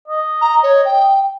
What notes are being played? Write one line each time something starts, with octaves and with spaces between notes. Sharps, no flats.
D#5
A#5
C#5
G5